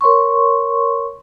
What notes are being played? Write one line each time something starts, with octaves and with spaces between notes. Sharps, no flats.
A#4 C#5 C6 C#6